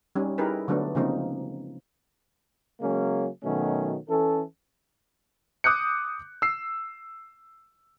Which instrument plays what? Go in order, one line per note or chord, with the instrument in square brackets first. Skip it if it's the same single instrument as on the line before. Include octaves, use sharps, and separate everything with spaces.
[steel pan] G3 C#4 D#4
D#4 E4 G4 G#4 A#4 B4
D3 F#3 A3 B3 D4
C#3 F3 G#3 A#3 C4 D#4
[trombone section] C#3 F#3 G#3 A#3 C#4
B2 D#3 F#3 A3 C#4
E3 C#4 A4
[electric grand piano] D6 D#6 F#6 G6 C#7
E6 C7